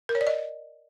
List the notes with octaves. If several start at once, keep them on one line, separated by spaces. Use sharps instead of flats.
A#4
C#5
D5
D#5